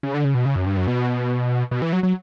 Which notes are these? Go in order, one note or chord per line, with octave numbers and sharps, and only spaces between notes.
C#3
D3
C#3
B2
C#3
F#2
G2
F#2
B2
B2
E3
F#3
F#3